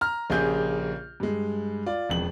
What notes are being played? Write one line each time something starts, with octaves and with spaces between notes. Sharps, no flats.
A#5 F6
A#1 C#3 A#3 G4 G#4 G6
G2 G#3
F4 D5
E1 F2 F#7